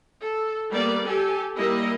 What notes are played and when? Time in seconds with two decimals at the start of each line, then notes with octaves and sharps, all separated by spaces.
0.20 A4
0.70 G3 A#3 B3 D5
1.04 G4 A4 G#5
1.56 G3 A#3 E4 D#5